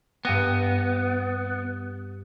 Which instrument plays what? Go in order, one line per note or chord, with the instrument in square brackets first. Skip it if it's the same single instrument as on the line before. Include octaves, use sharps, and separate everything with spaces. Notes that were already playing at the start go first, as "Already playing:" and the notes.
[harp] G2 G5 A#6 [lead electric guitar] B3